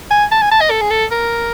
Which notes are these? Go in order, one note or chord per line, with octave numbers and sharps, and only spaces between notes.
G#5
A5
G#5
A5
D#5
A4
G#4
A4
A#4